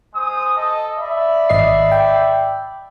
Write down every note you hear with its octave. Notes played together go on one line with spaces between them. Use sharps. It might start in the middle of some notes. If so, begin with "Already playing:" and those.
G#3 C5 D#6
A4 D#5
D5 E5 B5
G#1 D#5 C7
G5